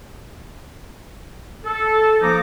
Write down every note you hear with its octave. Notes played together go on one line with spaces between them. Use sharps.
A4
F3 A#3 D#4 A#5 D6